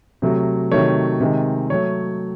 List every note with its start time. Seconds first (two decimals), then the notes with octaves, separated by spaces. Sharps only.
0.22 C3 F#3 A3
0.72 C3 D#3 F#3 A3 C#5
1.20 C3 D#3 G#3
1.70 F#3 A3 C#5